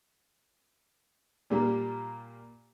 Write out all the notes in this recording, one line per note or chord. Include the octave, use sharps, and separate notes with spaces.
A#2 G3 A#3